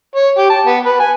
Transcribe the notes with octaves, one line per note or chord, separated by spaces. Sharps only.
C#5
G4
A5
B3
B4
G#5